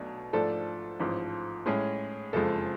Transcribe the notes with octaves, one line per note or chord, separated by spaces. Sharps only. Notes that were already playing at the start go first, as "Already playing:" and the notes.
Already playing: B1 B2 F#3 A3 D4
G#2 F3 A3 D4 A4
A1 G#2 F3
A2 G#3 C#4 G#4
F#1 F2 F3 G#3 A4